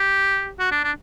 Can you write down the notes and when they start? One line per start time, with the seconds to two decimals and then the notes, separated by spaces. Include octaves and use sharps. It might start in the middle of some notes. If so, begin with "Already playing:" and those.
Already playing: G4
0.59 F#4
0.71 D4
0.84 D4